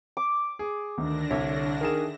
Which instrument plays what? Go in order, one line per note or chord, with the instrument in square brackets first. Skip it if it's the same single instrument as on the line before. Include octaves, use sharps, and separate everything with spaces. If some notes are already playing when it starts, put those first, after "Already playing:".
[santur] D6
[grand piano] G#4
[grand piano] D2 [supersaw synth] D3 D4 A#6 [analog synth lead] D#3
[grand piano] C2 [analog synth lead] C#5 [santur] E5
[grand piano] D#3 G#4 E7 [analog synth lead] A#4